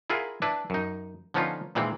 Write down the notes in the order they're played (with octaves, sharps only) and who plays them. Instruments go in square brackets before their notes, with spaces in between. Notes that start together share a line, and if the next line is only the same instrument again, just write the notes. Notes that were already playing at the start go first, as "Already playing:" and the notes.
[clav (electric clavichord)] E4 F4 G#4 A#4 F#5
D4 E4 B4
F#2 D#4
D3 F3 B3 C#4 D#4 F4
A#2 D#3 E3 G#3 C4